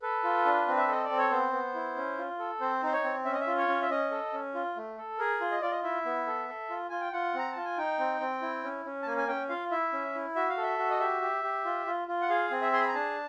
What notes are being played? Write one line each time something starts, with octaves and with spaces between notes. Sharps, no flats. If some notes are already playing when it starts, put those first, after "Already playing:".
A4 B4
F4
D4
C4
E5
A4 D#5
D5
C4
C#5
B3 C5
B3
E4
C#4
F4
A4
C4 C5
D#4 C5
C#5
C4
C#4 E5
D#5
E5
F4
C#5
C#4
E5
C#4 D#5
A4
C#4
F4
A3
A4
G#4 A#4
F4
D#5
F4 D5
D#5
E4 E5
B3
A4
A4
F4
F4 G#5
G5
F4 F#5
C4 A#5
F4 A5
G#5
D#4 G5
C4
C4
E4
C#4
C#4
A5
A#3 G#5
G#5
C#4 G5
F4 F5
E4 E5
C#4
E4
F#4 E5
F5
A4
E5
F#4
D#5
G4 E5
G4
G4
F4
F4
F4
F#5
G#4 F5
C4
E5
G#4 C6
B5
A#5
D4 A5